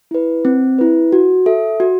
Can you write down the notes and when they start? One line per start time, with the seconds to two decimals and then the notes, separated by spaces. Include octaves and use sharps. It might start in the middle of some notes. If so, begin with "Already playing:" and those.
0.11 E4 B4
0.45 C4
0.78 E4 B4
1.12 F#4
1.46 A4 E5
1.80 F#4